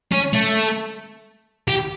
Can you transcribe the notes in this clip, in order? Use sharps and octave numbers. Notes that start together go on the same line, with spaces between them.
C#4
A3
G4